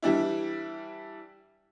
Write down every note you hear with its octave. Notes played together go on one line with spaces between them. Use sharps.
E3 G3 D4 E4